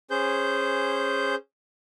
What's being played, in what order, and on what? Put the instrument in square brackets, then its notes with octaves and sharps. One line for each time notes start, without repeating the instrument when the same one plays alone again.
[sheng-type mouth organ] C#4 G#4 C5 G6